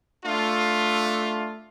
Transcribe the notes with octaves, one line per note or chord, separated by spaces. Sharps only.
A3 D4 F4